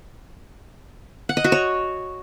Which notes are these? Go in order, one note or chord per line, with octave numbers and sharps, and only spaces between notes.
F#5
D#5
F#4
C#5